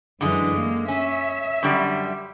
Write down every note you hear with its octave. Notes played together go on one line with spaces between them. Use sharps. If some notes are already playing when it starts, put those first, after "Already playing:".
F#2 D3 E3 G#3
A#3
C#4 E5
F#2 D3 G3